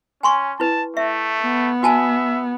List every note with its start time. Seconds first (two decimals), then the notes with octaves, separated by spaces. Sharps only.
0.23 C#4 G#5 C6 C#6
0.60 E4 B4 A5
0.97 A3 E5
1.43 B3
1.83 F#4 E5 G#5 A5